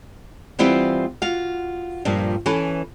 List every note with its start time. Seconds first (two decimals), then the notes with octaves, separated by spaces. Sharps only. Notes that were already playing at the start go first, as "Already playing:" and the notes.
0.59 E3 G3 B3 C4 E4 F4
1.22 F4 F#4 F5
2.05 G2 A#2 F3
2.46 E3 C#4 A4 B4